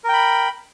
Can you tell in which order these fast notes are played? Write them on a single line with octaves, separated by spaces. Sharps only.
A#4 G5 B5